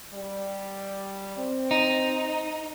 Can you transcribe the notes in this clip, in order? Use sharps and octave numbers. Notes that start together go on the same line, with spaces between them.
G3 D5
C4
D#4